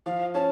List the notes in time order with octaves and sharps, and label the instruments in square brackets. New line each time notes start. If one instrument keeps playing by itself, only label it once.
[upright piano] F3 [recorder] F5
[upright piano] C#4 [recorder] A5